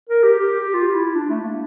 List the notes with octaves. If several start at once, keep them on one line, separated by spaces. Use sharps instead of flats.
A#4
G4
G4
G4
F4
F4
E4
D4
A3
A3
A#3